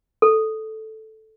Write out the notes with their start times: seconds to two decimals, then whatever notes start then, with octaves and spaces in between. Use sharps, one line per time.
0.22 A4